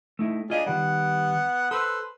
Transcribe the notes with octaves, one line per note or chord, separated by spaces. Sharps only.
A3 D#4 E4
D4 F4 G#4 D#5 F5
D#3 G3 B3 F#5
A4 B4 C5 E6